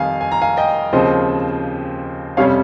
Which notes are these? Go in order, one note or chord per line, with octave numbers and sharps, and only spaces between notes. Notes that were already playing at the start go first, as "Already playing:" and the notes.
Already playing: F2 D#3 G3 F5 G#5
G#5
A#5
F5 G#5
D#5 G5
D#2 C#3 F3 C4 C5 D#5
F2 C3 G3 C#4 C#5 F5